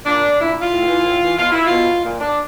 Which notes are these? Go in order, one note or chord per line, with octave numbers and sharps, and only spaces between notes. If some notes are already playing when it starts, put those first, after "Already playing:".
A#2 D4
A#2 E4
F4
A2
E3
A2
E3
B2 F4
E4
B2 F4
A#2
D4